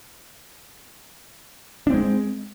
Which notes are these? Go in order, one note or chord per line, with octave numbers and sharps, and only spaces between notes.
G#3 C4 D4